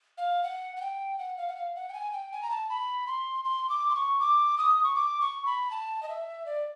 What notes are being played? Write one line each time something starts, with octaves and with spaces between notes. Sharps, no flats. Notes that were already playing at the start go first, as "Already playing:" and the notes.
F5
F#5
F#5
G5
F#5
F5
F#5
F5
F#5
G5
G#5
G5
G#5
A#5
A5
B5
C6
C6
D6
C6
C#6
D6
D#6
C#6
D6
C#6
B5
A5
D#5
E5
D5